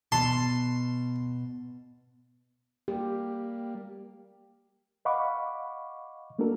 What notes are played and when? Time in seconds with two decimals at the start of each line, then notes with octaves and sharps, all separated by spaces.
0.12 B2 A5 C6
2.88 G3 A#3 G4
5.05 D#5 F5 F#5 B5 C#6 D6
6.39 A3 A#3 D4 F#4 A4 A#4